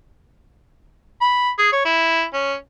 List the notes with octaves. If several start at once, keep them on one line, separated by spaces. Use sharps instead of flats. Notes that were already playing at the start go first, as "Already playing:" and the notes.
B5
G#4
C#5
E4
C#4